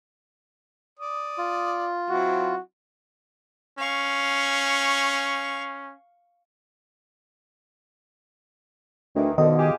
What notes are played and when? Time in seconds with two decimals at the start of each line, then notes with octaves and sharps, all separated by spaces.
0.99 D5 D#6
1.38 F4
2.10 F#3 C4 E4 F#4
3.79 C#4 F5 C#6
9.16 D2 D#3 E3
9.38 F2 B2 D3 D#3 D#5
9.58 F4 G4 G#4